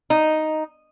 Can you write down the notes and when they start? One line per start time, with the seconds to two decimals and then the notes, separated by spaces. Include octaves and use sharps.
0.10 D#4